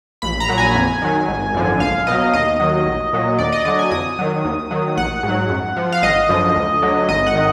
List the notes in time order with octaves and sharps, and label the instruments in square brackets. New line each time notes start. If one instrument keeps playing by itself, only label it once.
[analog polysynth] A#1 B5
A#5
A#2 F#3
G#5
F2
D#3 F#3
G#1
F#2 D3 F3
B1 F5
B2 F#3 D#5
D#2 D#5
D#3 F#3
A#1
A#2 F#3
D#2 D5
D#5
D3 F#3 D#5
G#5
F2 D#6
D#3 F#3
D#2
D#3 F#3
A#1 F#5
G#2 F#3
F#2
F3
F5
G#1 D#5
F#2 D3 F3
D2
D3 F#3
G#1 D#5
F#5
D#3